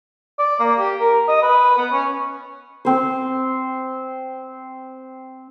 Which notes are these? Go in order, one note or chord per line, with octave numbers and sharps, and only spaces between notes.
D5
A#3
G4
A#4
D#5
B4
B3
C#4
C4 C5